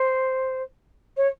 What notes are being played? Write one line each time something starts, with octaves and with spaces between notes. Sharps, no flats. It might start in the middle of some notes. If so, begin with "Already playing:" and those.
Already playing: C5
C#5